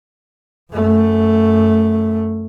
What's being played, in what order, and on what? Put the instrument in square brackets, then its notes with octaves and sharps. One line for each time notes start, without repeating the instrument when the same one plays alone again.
[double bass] F#2 A3